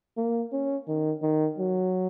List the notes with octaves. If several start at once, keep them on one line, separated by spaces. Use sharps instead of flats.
A#3
C#4
D#3
D#3
F#3